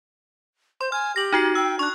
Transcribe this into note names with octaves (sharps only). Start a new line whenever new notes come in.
C5 C6
G#5 F6
G4 A#6 F#7
D#4 F#4 C7
G5 E6
D4 C#6 F#6